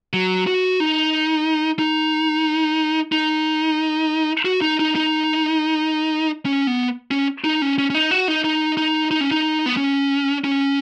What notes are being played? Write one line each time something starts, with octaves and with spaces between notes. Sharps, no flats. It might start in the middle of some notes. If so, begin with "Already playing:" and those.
F#3
F#4
D#4
D#4
D#4
F#4
D#4
D#4
D#4
C#4
B3
C#4
D#4
C#4
C#4
C#4
D#4
F#4
D#4
D#4
D#4
D#4
C#4
D#4
B3
C#4
C#4